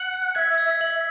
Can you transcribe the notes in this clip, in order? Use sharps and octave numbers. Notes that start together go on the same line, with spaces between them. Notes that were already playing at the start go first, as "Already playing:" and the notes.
Already playing: F#5 F#7
C#7
E5 G#6
E6
E5 F#7